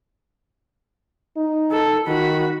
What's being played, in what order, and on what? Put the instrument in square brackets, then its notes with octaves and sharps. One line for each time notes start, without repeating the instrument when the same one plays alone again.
[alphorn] D#4
[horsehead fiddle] A4
[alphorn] D#3 [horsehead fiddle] F#4 B5